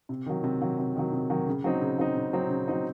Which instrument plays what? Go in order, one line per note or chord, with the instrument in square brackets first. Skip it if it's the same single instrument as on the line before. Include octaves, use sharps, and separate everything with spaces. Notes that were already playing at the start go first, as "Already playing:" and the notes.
[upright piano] C3
D#3 F#3
C3
D#3 F#3
C3
D#3 F#3
C3
D#3 F#3
C#3
F#3 C4 D#4
C#3
F#3 C4 D#4
C#3
F#3 C4 D#4
C#3
F#3 C4 D#4